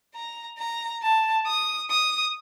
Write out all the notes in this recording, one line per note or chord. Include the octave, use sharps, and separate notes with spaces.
A#5
A#5
A5
D#6
D#6